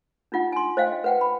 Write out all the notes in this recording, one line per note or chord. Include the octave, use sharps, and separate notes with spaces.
D4 D#4 F4 F#5
G#5 C6
C5 D#5 F5 G5
B4 F#5 G5
B5